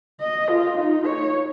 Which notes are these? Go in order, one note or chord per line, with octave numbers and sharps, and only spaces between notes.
D#5
F4
D#4
C#5